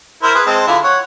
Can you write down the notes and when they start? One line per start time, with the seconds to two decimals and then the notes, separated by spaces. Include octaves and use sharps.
0.23 E4 A#4 C5
0.35 G#4 B4
0.46 G#3 C4 A5
0.67 D3 E4 F4
0.84 C#5 F#5